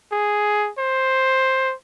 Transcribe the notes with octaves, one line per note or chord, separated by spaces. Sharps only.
G#4
C5